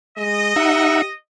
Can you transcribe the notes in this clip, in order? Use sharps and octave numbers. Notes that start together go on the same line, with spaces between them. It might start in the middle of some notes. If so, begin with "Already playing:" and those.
G#3 D#5
D#4 G4 E5 F#5